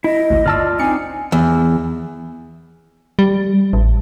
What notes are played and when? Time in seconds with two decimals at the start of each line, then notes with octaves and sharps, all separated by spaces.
0.04 E4 D#5
0.30 A1 D2
0.46 G1 F4 D5 A5 E6 F6
0.80 C4 D4 D#4 G#5 C#7
1.32 E2
3.19 G3
3.73 A1